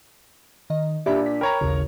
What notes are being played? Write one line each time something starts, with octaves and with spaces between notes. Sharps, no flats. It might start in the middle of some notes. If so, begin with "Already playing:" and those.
D#3 D#5
A#2 D4 G4 D5 E5 B5
B6
A#4 C#5 G5 A#5 B5
A1 D#2 C#3